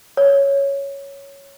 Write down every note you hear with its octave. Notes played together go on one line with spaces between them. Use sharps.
C#5